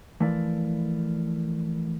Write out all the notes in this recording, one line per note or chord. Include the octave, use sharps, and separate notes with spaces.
E3 F3 A3 E4 A#4 D5